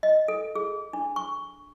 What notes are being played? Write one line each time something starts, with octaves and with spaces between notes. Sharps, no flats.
D#5
A4
G#4
D4
C#6